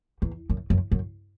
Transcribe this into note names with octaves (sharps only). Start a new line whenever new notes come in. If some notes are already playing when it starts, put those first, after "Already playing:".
E2
F#2
F#2
F#2